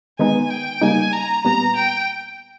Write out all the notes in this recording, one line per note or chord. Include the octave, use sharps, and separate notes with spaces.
D#3 G#3 B3 D#4 G#5
G5
C#3 G3 A#3 D#4 G#5
A#5
A#2 G3 B3 A#5
G5